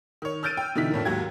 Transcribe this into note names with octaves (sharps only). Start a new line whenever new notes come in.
D#3 C#5
E6 F6 G6 A6 D7 D#7
G5
B2 D3 E3 D#4 B6
F2 A2 D4 A#4
D#2 G#2 F#3 F#4 G4 G#6